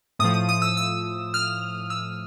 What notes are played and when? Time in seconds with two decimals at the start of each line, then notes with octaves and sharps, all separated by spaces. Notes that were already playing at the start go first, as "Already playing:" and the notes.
0.19 A2 F3 D#6
0.34 D#6
0.49 D#6
0.62 E6
0.77 E6
1.34 F6
1.90 E6